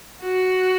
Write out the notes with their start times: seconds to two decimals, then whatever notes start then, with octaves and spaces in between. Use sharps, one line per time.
0.22 F#4